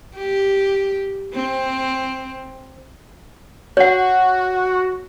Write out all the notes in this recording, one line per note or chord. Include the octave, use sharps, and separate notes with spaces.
G4
C4
F#4 C#5 F#5